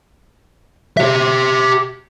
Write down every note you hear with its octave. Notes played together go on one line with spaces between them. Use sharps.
G4 E5